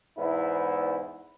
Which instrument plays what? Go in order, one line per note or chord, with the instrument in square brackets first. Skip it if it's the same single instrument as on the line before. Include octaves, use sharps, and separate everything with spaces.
[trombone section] E2 G#2 E4